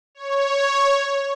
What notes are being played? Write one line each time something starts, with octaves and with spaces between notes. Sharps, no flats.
C#5